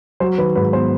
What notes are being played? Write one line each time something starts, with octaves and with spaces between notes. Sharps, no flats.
F#3 C5
D#3 B4
G#2 B4
B3 C5